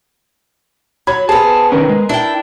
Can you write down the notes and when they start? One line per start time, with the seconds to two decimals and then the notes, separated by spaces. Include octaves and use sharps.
1.07 F#3 B5 G#6
1.29 B3 C4 G#4 A5
1.72 C3 D#3 C#4 A#4 B4
1.89 G#3
2.09 D4 E4 G5